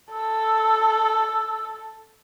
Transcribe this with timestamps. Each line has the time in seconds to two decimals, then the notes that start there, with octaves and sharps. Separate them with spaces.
0.13 A4 E6